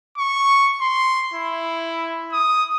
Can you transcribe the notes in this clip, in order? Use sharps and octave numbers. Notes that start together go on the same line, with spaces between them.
C#6
C6
E4
D#6